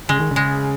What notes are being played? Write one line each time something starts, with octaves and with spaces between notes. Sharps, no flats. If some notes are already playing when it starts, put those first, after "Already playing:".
C#3 G#3
D#3
C#3 G#3